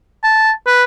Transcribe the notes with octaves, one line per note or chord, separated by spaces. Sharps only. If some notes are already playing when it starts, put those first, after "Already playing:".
A5
B4